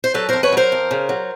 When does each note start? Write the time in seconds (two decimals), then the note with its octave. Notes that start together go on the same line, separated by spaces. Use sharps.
0.04 C5
0.14 F#3 A4 B4
0.29 F2 A#4 C5
0.43 B4 C#5
0.52 F#3 A#4 C5
0.72 F2
0.91 C#3
1.09 F#3